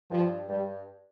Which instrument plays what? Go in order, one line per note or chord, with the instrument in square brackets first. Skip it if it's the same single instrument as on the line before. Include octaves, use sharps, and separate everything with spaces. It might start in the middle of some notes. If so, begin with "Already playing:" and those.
[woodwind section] G2 [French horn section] F3
[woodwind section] G2 [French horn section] G3